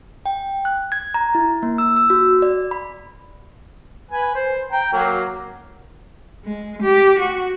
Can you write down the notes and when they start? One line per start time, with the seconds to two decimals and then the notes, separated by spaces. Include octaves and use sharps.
0.26 G5
0.65 F#6
0.92 G#6
1.14 A#5
1.35 E4
1.63 A#3
1.78 E6
1.96 E6
2.10 F#4
2.42 D5
2.71 B5
4.11 B4 G#5
4.35 C5
4.72 G5 A#5
4.93 F#3 A#3
6.45 G#3
6.83 G4
7.19 F#4